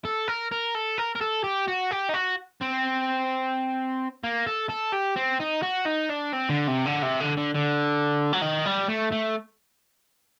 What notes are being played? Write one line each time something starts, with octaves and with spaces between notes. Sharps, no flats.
A4
A#4
A#4
A4
A#4
A#4
A4
G4
F#4
G4
D#4
F#4
C4
A#3
A4
A4
G4
C4
D#4
F#4
D#4
D4
C4
D3
C3
D3
C3
D3
D3
D3
F#3
D#3
G3
A3
A3